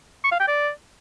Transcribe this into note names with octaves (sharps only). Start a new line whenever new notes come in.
C#6
F5
G5
D5